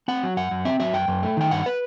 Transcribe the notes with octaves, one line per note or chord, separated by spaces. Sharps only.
C4 F#5
F#3
F#2 F#5
F#2
C4 E5
F#3 E5
F#2 G5
F#2
A3
D#3 G5
G2 F#5
B4